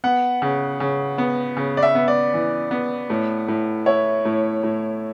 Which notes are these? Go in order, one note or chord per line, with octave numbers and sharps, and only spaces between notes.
B3 F#5
C#3
C#3
B3
C#3
D5
E5
B3
D5
E3
B3
A2
A2
E4 C#5
A2
A2